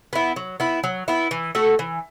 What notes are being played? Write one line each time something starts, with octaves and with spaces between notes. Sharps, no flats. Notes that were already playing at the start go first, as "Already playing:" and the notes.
B3 E4
F#3
B3 E4
F#3
B3 E4
E3
A3 F#4 A4
E3